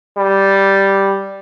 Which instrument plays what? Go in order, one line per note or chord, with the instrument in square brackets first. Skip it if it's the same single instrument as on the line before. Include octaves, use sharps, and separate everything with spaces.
[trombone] G3